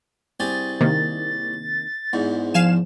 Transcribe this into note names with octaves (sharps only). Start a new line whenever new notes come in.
C2 G4 G#4 A6
C3 D#3 A#3
E2 G#2
F3 F5 G#5 E7